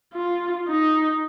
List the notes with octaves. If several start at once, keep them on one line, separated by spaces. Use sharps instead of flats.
F4
D#4